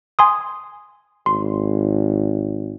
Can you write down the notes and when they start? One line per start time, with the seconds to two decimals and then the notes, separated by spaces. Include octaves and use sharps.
0.19 G#5 C6 D#6
1.26 G#1 C6